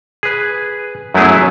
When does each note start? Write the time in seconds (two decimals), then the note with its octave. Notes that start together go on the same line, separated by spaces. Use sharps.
0.23 G#4 B4
1.14 F#2 F#3 A3 B3 E4 G#4